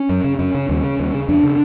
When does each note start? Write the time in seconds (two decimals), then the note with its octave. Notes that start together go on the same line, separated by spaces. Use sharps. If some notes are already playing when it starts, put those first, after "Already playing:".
Already playing: C#4
0.09 F#2
0.24 C#3
0.39 F#2 C#4
0.54 C#3
0.69 D#2
0.83 C#3
0.99 D#2
1.14 C#3
1.28 F2 D4
1.43 C#3